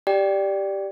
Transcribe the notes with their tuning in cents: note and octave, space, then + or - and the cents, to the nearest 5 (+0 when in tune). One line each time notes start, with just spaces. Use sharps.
G4 +0 D5 +0 G5 +0